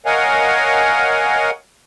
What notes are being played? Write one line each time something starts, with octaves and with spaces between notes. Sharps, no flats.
A#4 C#5 D#5 F5 F#5 G#5